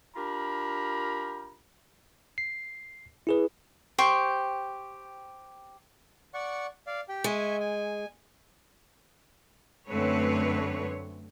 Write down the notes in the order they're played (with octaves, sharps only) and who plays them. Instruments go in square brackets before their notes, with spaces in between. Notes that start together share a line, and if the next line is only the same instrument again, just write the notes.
[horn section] D4 F4 G4 A#4 A#5 B5
[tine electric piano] C7
E4 G#4 B4
[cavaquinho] G4 C5 G5 C#6
[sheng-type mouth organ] D5 F#5 C#6
D5 F5
G4 G5
[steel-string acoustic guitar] G#3 [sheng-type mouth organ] E5 G#5 C#6
[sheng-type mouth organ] G#5
[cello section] F#2 D3 A3 C4 B4 C#5